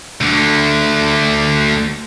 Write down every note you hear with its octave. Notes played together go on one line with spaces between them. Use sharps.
D2 D3